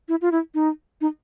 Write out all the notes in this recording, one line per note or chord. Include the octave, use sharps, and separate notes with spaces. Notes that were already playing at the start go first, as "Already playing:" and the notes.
E4
F4
E4
D#4
D#4